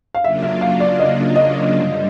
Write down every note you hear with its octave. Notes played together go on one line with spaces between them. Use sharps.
F5
C#3 F#3 A#3 D4 F4 E5
E5
F5
D5
D#5
D#5
G2 D3 G3